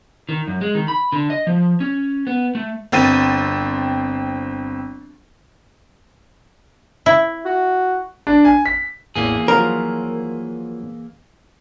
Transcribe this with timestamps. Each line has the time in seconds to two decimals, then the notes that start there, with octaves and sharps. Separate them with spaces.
0.29 D#3
0.47 F#2
0.61 G#3
0.75 D#3
0.88 B5
1.12 D3
1.30 D#5
1.47 F3
1.80 C#4
2.27 B3
2.55 A3
2.92 G1 C4 A6 D#7
7.06 E4
7.46 F#4
8.27 D4
8.45 G#5
8.66 B6
9.16 A1 E2 E3 A#3 G#4 G5
9.48 F3 F#3 F4 A#4